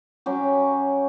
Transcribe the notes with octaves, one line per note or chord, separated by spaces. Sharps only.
F#3 C#4 G4